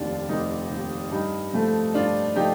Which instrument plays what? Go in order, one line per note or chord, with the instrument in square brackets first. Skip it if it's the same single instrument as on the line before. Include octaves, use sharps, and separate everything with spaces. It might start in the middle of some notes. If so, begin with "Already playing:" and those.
Already playing: [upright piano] F1 D#2 D#3 [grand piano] D4 F4
[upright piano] F1 [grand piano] D#4
[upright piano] D#2 D#3
[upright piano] G2 [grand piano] D#4
[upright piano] F3 A3
[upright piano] G2 [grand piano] D4 F4
[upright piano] F3 A3 [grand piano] D#4 G4